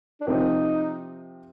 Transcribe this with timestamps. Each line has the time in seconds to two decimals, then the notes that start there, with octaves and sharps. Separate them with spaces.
0.21 D4
0.27 C3 F3 C4 D#4 G4 A#4